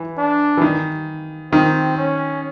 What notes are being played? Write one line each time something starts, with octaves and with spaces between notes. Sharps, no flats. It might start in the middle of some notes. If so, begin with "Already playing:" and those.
Already playing: E3
D4
E3
D#3
D#3 C4
C#4